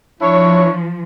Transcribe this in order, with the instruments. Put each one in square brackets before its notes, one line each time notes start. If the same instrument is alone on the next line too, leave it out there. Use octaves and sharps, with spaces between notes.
[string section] F3 [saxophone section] D4 E4 C#5